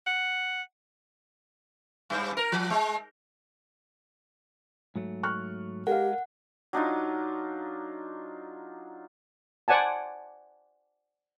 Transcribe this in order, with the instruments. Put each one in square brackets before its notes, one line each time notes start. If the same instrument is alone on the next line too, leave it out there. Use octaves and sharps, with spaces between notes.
[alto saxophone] F#5
[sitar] G2
A#4
F3
G#3
[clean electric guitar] G#2 F#3 A3
[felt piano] C#6 F6 F#6
[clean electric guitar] G#3 [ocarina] G4 [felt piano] A#4 F5 [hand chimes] F#5
[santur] F#3 D4 D#4 F4
[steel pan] C5 D5 F#5 G#5 A5